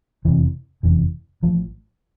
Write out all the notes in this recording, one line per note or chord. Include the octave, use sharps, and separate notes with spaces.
F1 E2 C3 E3
F1 E2 C3 E3
A1 A2 F3